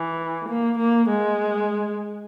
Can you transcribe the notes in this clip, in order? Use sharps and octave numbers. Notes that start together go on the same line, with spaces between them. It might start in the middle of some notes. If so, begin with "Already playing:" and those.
Already playing: E3
A#3
A#3
G#3